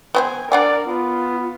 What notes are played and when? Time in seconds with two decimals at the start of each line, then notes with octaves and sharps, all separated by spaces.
0.15 B3 C4 C5 G#5
0.52 D4 A#4 D5 F#5 G#5
0.86 B3 F4